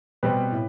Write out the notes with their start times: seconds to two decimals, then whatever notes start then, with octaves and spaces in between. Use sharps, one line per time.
0.23 B2 G3 C4 G4 B4
0.52 A2